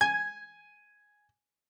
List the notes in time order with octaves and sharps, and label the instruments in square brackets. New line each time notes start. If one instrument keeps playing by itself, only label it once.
[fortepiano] G#5 [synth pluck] G#6